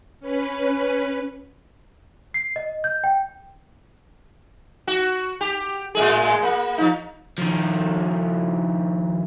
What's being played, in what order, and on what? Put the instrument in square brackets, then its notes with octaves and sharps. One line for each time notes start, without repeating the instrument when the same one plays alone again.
[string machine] C#4 B4
[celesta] C7
D#5
G6
G5
[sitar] F#4
G4
A2 G#3 G#4
A#3
F3 D#4
[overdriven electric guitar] D#3 F3